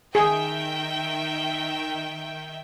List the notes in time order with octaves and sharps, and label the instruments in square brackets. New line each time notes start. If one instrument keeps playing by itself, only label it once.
[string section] D#3 E5 G5 [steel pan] G#4